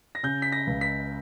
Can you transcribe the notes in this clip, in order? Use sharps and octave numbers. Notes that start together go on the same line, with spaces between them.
A#6
C#3 G6
B6
A#6
C#2
B6